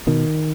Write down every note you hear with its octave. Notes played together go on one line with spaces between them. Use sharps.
B2 D#3